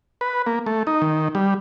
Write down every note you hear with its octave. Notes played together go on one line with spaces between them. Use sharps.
B4
A#3
A3
D#4
D#3
G3